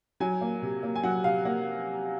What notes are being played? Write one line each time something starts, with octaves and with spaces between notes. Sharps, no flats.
F#3 G#5
A#3
C3
A#3
G#5
F#3 F#5
C3 F5
A#3 F#5